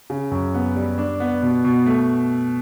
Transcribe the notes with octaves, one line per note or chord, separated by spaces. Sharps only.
C#3
F#2
B3
G3
D4
B3
B2
B2
A3